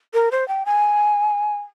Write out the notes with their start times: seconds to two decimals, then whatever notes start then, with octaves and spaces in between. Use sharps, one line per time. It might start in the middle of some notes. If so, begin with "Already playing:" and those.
0.14 A#4
0.31 C5
0.48 G5
0.66 G#5